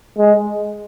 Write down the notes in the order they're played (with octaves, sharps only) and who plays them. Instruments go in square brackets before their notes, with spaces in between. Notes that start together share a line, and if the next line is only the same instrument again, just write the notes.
[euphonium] G#3